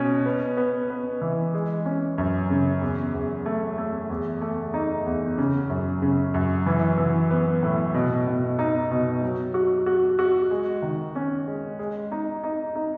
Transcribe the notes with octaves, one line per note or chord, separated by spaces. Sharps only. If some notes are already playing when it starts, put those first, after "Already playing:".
Already playing: B2 C#4
B3
B3
B3
E3
G#3
C#4
F#2
C#3
E2
E2
A3
A3
E2
A3
D#4
E2
C#3
F#2
C#3
F#2
E3
E3
B3
A2
B2
B2
D#4
B2
F#3
F#4
F#4
F#4
G#3
D#3
C#4
G#3
G#3
D#4
D#4
D#4